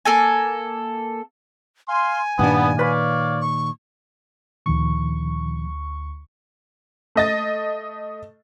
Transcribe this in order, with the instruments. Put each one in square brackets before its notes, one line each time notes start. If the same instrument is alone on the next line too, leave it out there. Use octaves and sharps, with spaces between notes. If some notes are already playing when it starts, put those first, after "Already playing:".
[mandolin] A#3 A4 G#5
[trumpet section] F5 C6 [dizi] G#5
[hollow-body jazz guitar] G2 D4 [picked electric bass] A#2 D#3 [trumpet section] B3
[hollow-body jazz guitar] B4 B5 [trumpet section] C#5 D5 F5
[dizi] C#6
[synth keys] D2 C#6 [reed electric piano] A#2 D#3 F3
[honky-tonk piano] A3 D#5 A6